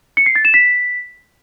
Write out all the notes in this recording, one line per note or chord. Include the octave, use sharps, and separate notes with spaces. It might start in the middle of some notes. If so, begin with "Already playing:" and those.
C#7
C7
A6
E7
B6